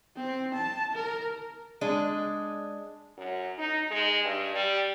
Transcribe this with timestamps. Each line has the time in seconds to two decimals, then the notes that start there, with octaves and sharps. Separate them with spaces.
0.16 C4
0.55 A5
0.94 A#4
1.81 G#3 D4
3.17 F#2
3.58 D#4
3.91 G#3
4.24 G2
4.54 G3